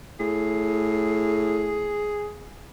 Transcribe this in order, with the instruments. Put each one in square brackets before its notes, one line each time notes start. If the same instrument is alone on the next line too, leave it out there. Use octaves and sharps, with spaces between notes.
[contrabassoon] A2 [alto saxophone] G#4